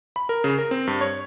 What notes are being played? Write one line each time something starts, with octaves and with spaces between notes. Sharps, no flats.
B5
A#4
C#3
A#4
C4
G2
C#5